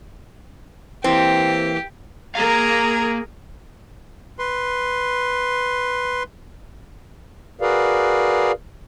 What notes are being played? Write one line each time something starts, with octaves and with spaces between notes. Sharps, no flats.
E3 A#3 C4 G4
A#3 G#4 A#4 F5 A#5 G#6
B4 C6
F#4 G#4 A#4 B4 D5 F5